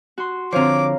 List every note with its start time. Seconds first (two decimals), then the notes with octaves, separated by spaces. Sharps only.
0.18 F#4 C6
0.53 D3 F3 C4 C5 C#5 F5 A#5 D6